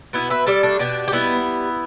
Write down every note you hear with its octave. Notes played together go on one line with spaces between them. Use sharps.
B2 B3 E4
B4 E5
G3 A4 D5
A3 D4
B2 D4 G4
G4
G3 B3 E4